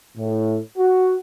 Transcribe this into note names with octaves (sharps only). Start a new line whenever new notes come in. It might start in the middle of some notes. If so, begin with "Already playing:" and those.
A2
F#4